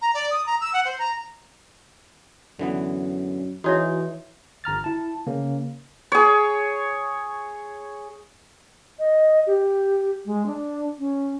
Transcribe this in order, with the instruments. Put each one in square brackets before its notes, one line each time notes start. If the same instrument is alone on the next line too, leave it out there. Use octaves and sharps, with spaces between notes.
[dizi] A#5
D5
D#6
A#5
E6
F#5
C5
A#5
[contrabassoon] F#2 [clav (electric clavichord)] D3 E3 B3
[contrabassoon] E3 [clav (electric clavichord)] D#4 G#4 [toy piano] F#4 C#5 E5
[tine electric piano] G1 A#5 F6 A6
E4 A5
C#3 A#3 C#4
[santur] G#4 C#5
[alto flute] D#5
G4
G#3
D4
C#4